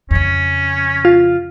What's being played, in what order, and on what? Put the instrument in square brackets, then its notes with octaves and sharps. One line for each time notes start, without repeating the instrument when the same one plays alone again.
[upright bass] F2 C#3 [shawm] C#4
[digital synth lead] F4